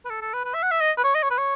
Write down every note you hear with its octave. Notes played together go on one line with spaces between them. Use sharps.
B4
A4
A4
B4
B4
E5
F#5
E5
D#5
B4
C#5
D#5
C#5
B4
C#5